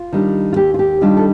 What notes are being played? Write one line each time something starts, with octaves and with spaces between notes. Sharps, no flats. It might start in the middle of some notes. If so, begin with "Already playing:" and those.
Already playing: F4
D#3 G3 D4
F4
D#2 G4
F4
G4
D#3 G3 D4 F4
A4